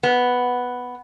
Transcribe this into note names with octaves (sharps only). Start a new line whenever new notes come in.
B3